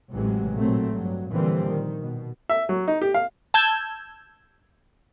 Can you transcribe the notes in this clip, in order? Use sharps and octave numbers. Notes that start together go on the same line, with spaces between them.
A1 A2 C3 E3 F#3 G#3
A#2 F#3 A3 C4
G2 F#3
A#2 D3 E3 F3 G3 C4
D#3
B2
E5
F#3
D#4
G4
F5
A5 E6 G6 G#6